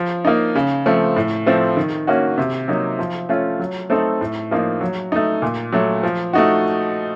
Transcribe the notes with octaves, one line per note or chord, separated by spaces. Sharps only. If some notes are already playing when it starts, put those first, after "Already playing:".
Already playing: F3
A#3 D#4
C#3
F3 A3 C4
A2
F3 A3 C4
D#3
A#3 C#4 F#4
C3
F#3 A#3 D#4
F3
A3 C#4 F4
F#3
A3 C4 D#4 A4
A2
F3 A#3 D#4
F#3
A3 D#4
A#2
F#3 A3
F3
A3 D#4 F#4